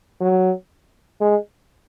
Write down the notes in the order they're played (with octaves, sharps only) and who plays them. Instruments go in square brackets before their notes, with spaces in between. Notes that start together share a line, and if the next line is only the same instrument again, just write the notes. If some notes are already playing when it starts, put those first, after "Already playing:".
[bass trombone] F#3
G#3